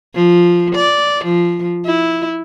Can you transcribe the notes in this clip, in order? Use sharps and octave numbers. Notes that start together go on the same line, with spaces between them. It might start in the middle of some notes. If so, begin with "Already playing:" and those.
F3
D5
F3
E4